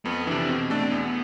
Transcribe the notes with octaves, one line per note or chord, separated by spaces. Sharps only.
F2 B3
C3 E3 D4
B2 C4
A3 D4 A4
E2 B3